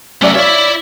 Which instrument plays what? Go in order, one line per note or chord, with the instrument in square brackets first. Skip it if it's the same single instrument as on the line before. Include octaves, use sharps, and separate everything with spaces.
[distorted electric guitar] F#3 A3 [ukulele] C#4 D5 E5
[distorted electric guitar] E4 E5 [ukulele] C#5 F5 [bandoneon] D5